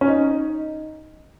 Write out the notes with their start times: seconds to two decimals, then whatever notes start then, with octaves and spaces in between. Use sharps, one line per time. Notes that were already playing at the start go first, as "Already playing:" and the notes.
0.01 C#4
0.07 D#4